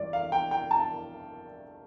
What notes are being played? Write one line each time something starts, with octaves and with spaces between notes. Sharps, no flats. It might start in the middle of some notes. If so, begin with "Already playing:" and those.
Already playing: A1 G2 D5
F5
G5
G5
A5